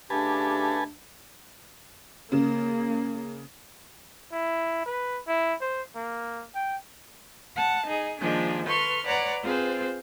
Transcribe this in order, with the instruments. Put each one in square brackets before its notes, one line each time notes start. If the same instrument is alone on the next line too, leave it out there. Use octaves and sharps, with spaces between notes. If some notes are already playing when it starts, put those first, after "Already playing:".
[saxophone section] C#3 A3 G4 [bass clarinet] D4 [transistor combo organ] B4 G#5 A5
[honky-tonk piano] C#3 [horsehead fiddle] A#3
[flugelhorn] E4
B4
E4
C5
A#3
G5
[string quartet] F#5 A5
D#4 G#4
D#3 F3 G#3 A#3 D4 G#4
A4 B4 C6 C#6 F6
B4 C#5 D5 F#5 A#5
C4 F4 G#4 B4 C5